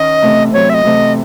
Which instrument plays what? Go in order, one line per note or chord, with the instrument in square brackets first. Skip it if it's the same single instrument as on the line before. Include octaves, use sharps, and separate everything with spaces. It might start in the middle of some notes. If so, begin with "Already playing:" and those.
Already playing: [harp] D#3 C#4 [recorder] D#5
[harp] C3 E3 A3 C4
[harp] C3 F#3 C4 [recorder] C#5
[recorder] E5
D#5
[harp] C3 E3 A3 C4